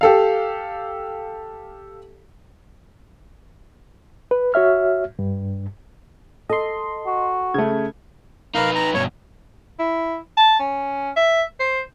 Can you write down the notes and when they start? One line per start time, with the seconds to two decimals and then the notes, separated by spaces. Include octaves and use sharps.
0.01 G4 A4 F5
4.31 B4
4.54 F#4 C#5 E5 F6
5.19 G2
6.49 A4 D#5 C6
7.06 F#4
7.54 C#3 A3 G#6
8.55 D#4 A#4 B4 F5
8.75 A#5
8.94 G2 B2 C#5
9.79 E4
10.37 A5
10.59 C#4
11.16 E5
11.59 C5